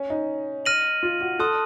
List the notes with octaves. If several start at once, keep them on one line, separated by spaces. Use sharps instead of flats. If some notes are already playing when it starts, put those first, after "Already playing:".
Already playing: C#4
D#4
F6 A#6 D#7 F#7
F4
F#4
A4 A5 C6 D#6 F#6